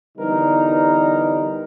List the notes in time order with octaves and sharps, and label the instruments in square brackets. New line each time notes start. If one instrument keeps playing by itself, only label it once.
[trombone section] D3 E3 G3 B3 D#4 A#4